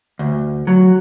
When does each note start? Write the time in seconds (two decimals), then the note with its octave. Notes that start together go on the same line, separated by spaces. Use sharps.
0.19 D2
0.67 F#3